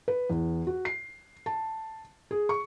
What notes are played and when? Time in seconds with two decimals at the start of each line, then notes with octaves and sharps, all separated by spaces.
0.08 B4
0.30 E2
0.67 F#4
0.85 C7
1.46 A5
2.31 G#4
2.49 C#6